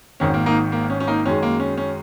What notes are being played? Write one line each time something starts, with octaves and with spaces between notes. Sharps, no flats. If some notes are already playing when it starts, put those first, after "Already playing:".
G#1 G#2 D#3 C#4
A#3
A#3 D#4
A#3
C#4
C#4
A#3 D#4
F#2 D#3 G#3 C#4
A#3
C#4
C#4